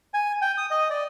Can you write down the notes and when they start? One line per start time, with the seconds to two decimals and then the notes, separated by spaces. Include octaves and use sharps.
0.14 G#5
0.42 G5
0.58 D#6
0.71 D#5
0.90 D5